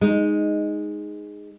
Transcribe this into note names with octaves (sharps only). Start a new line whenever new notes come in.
G#3 D#4